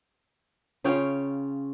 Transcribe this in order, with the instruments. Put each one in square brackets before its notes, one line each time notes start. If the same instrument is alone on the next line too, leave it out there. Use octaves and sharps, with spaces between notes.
[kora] C#3 C#4 F4 G5